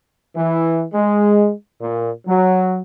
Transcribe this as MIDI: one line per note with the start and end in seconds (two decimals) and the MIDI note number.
0.36 0.84 52
0.93 1.51 56
1.81 2.10 46
2.28 2.82 54